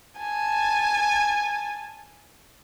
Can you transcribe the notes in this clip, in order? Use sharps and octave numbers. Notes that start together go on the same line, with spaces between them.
G#5 A5